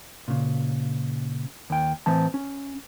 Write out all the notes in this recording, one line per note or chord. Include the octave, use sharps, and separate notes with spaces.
A#2 C#3
D#2 G5
A2 E3 C4 A5
C#4